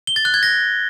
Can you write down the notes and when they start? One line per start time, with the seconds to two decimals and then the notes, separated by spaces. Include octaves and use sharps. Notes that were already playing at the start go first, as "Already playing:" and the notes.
0.07 G7
0.16 A6
0.25 F#6
0.34 G#6
0.43 A#6